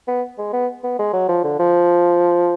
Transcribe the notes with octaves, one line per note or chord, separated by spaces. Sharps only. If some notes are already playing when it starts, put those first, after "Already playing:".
B3
G#3
B3
B3
G#3
F#3
F3
D3
F3